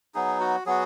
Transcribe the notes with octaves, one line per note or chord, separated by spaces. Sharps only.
F#3 B3 D#4 G#4
F#4
F#3 B3 F#4 G#4